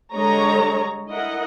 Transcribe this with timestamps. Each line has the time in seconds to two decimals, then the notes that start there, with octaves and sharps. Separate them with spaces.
0.13 D3 G3 G#3 C#5 D#5 A#5
1.10 E4 A#4 D#5 F#5